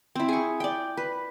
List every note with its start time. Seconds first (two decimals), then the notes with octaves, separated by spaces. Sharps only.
0.15 C4 E4
0.28 G#4 C#6
0.60 D5 G5
0.97 B4